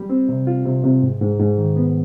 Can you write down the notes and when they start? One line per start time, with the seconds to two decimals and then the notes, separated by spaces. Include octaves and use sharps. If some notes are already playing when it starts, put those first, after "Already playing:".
Already playing: G3
0.10 C4
0.29 C3
0.47 F4
0.65 C3
0.84 C3
1.02 G#2
1.21 G#2
1.39 G#2
1.58 D#3
1.76 B3